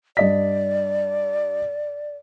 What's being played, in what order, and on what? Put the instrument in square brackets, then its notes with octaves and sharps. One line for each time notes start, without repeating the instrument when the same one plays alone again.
[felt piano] G2 D#5 B6 [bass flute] D5